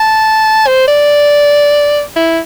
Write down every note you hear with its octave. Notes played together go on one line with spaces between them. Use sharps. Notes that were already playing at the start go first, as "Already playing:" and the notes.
Already playing: A5
C5
D5
E4